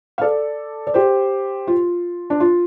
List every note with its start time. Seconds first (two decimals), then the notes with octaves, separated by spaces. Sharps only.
0.18 F5
0.21 A4 D5
0.87 D5
0.94 G4 C5
1.67 F4
2.30 D4
2.40 F4